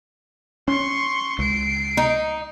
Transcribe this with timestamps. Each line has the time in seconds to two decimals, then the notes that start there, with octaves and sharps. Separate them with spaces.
0.68 C#4 C6 C#6
1.39 C#2 C7 D7
1.97 D#4